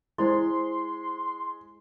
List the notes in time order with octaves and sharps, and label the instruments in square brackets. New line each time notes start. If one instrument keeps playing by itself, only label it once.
[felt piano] G#3 [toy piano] E4 C5 D5 [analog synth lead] C6